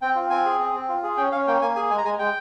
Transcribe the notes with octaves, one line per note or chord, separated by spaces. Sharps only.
C4 G5
F4
C4 G#5
G#4
C4
C4
F4
G#4
C#4 G5
C#4 F5
A#3 G5
A#3 G#5
G#4 G#5
G#3 G#5
A#5
G#3 G#5
G#3 G5